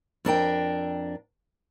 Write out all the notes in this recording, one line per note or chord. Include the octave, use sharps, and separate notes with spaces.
F2 D4 A#4 G5